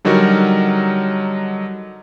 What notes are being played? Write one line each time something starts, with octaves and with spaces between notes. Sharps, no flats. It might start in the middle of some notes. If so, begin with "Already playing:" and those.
D3 F#3 G3 D#4 F#4 A#4